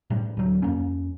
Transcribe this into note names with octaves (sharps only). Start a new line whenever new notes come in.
A2 G3
D2 F#3
F2 A#3 C#4